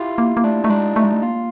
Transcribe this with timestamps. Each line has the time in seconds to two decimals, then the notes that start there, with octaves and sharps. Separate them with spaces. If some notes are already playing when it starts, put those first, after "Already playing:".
Already playing: E4 F4 G4
0.18 A#3
0.37 A#3
0.44 A3 D4
0.64 A3 D#4
0.70 G#3 D4
0.96 A3 D#4
1.04 G#3
1.13 A3
1.23 A#3 F4